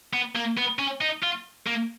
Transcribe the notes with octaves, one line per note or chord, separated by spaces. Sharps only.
B3
A#3
B3
C#4
D#4
F4
A#3